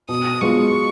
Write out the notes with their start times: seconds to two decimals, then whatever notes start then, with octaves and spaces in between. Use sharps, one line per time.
0.09 B2 D#6
0.41 G#3 B3 F4 C#6